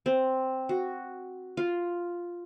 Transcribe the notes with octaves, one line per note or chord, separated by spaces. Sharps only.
C4
F#4
F4